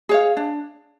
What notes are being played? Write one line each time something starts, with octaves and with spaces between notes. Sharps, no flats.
G#4 C#5 F5
D4